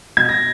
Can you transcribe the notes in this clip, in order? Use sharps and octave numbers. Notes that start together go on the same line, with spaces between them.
B2 G#6
A#6